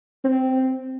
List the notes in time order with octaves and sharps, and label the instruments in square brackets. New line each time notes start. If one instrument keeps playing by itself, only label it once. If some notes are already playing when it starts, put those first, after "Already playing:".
[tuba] C4